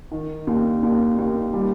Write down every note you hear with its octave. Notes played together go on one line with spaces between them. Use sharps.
D#3
D#2
D#2
D#2
G3